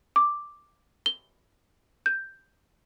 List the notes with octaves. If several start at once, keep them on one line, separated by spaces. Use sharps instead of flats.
D6
G7
G6